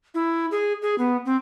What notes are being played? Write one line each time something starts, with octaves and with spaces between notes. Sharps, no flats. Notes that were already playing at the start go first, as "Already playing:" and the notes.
E4
G#4
G#4
B3
C4